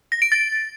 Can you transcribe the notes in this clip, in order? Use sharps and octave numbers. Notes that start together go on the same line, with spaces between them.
A#6
D7
A6